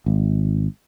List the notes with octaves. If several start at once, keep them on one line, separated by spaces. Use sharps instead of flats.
G#1